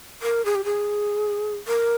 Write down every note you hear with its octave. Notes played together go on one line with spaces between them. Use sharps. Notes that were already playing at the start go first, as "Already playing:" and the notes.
A#4
G#4
G4
G#4
A#4